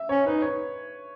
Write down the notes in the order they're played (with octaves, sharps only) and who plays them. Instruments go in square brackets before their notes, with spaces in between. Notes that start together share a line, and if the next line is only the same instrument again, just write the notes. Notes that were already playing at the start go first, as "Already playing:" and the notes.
Already playing: [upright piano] E5
[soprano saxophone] C#4 [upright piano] C#5
[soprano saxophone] D#4 [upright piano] B4
[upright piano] C#5